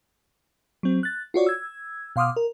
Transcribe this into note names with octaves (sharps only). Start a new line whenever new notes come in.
F#3 C4
F#6 A6
F4 F#4 C#5 D5
E6 G#6
B2 F5 C6 D6 D#6 F6
A#4